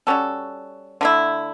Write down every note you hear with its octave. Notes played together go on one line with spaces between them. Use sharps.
G3 C#4 F#4 A4
D3 A3 E4